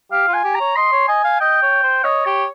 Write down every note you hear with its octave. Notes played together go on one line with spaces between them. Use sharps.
G4 F5
F4
G#5
G4
A#5
C#5
D#5 C6
C#5
D#5 G#5
F5
D#5 G5
C#5
C5
C#5 D#5
G4 C#5